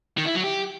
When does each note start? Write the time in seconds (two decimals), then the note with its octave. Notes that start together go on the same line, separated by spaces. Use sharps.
0.18 D#3
0.26 E4
0.35 F#3
0.44 G4